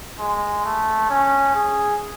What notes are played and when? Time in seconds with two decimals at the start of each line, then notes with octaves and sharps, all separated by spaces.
0.20 G#3
0.65 A3
1.10 C#4
1.55 G#4